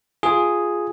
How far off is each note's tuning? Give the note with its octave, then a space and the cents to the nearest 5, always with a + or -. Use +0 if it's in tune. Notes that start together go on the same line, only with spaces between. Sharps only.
F4 +0 G#4 +0